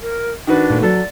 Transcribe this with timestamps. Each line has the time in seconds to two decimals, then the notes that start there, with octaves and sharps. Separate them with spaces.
0.02 A#4
0.47 D#3 D4 F#4 B4
0.70 A#2 A3
0.83 F#3 A4 D5